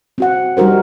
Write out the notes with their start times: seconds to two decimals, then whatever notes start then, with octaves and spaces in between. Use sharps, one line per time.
0.18 C4 F#4 F#5
0.57 G3 D#4 F#4 A#4 C5